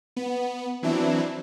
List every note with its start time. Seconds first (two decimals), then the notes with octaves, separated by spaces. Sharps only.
0.17 B3
0.83 E3 F#3 C4 D4 E4